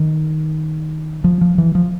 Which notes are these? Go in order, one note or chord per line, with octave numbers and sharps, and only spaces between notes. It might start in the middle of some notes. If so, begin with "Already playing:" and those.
Already playing: D#3
F3
F3
E3
F3